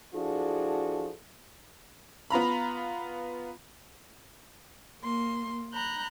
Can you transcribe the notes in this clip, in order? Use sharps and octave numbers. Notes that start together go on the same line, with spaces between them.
F3 D4 E4 F#4 G#4 A4
B3 F4 A#5 B5
A#3 C6
A#5 B5 F#6 G6